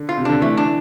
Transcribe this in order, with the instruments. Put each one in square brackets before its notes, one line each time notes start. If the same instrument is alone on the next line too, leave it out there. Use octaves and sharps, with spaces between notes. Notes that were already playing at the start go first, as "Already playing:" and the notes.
Already playing: [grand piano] D3
[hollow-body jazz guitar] F4
[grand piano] C3
[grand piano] D3 [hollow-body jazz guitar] D4
[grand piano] E3 [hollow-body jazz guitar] A3
[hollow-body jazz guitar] D4